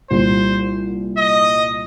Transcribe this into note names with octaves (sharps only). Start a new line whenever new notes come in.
C2 A#2 G3 C5
D#5